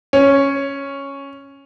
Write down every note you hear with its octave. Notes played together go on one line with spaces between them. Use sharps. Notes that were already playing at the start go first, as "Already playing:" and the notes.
C#4